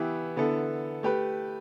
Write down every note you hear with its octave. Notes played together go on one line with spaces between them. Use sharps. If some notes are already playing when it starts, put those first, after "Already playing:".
Already playing: E3 B3 E4 G4
D3 B3 E4 A4
A3 G4 B4